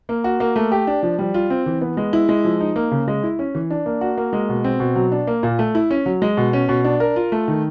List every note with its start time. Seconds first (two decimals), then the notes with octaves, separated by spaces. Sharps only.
0.09 A#3
0.24 F#4
0.40 A#3
0.56 A3
0.72 G4
0.87 D4
1.03 F3
1.19 G3
1.34 F4
1.50 C4
1.66 E3
1.81 B3
1.97 G#3
2.13 E4
2.29 G#3
2.44 F3
2.60 D#4
2.76 A#3
2.91 C#3
3.08 G#3
3.23 E4
3.39 C#4
3.55 E3
3.71 D4
3.86 A#3
4.01 F#4
4.18 A#3
4.33 G#3
4.49 B2
4.64 C4
4.80 B2
4.96 F#3
5.12 D4
5.27 A#3
5.43 A#2
5.59 A3
5.75 E4
5.91 C#4
6.06 F#3
6.22 G#3
6.37 B2
6.53 C#4
6.69 B2
6.85 D4
7.00 A#4
7.16 F4
7.32 A3
7.48 D#3